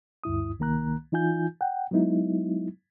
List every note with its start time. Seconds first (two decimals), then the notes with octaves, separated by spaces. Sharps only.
0.24 D2 G2 E4 D#6
0.59 C2 D#3 A#3 A#5 F#6
1.12 E3 D#4 F4 G#5 G6
1.61 F#5 G5
1.91 F#3 G#3 B3 D#4 E4